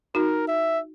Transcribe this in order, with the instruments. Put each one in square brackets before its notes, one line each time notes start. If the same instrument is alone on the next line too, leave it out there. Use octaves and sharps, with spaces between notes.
[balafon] D#4 F#4 [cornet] A#4
[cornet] E5